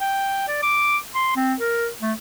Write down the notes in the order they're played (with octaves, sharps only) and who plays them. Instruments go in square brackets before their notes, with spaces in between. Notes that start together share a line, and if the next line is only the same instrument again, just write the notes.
[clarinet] G5
D5
D6
C6
C4
A#4
A3